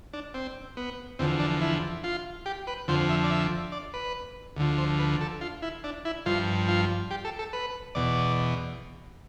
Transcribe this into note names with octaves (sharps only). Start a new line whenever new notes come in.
D4
C4
B3
E2 D3 F3 C4
D4
E4
F4
G4
B4
F2 D3 F3 C5
E5
D5
E5
D5
B4
D2 D3 F3
C5
B4
A4
F4
E4
D4
E4
G2 F3 F4
F4
G4
A4
A4
B4
E2 B2 D5